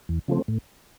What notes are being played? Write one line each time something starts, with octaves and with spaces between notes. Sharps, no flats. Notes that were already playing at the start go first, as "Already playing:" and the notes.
E2
C#3 F3 A3 C4
A2